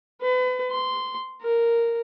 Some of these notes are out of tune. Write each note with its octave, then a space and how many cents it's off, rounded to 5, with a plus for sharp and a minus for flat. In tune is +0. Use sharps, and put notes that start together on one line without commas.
B4 +35
C6 -10
A#4 -5